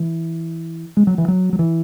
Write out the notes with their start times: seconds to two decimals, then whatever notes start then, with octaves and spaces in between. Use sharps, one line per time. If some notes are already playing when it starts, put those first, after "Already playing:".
Already playing: E3
0.97 G#3
1.07 F#3
1.18 E3
1.28 F#3
1.53 F#3
1.59 E3